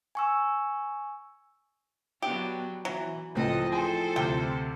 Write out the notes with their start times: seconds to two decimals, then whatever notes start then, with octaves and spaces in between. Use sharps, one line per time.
0.15 G#5 C#6 E6
2.22 F#3 B3 D4 G4
2.85 E3 F#3
3.35 C#2 A2 F3 C4 A4 D#5
3.72 G#4 A4 C5 G5 G#5
4.16 D2 C3 G5